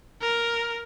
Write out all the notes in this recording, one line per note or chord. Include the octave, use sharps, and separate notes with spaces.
A#4